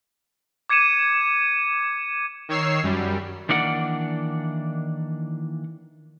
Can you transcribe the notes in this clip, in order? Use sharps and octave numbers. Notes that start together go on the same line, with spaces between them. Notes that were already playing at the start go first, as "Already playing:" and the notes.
D6 G#6 C#7 D#7 E7
D#3 C#5 E6 C7
F#2 G3
D#3 E3 A#3 D4 D5 F#5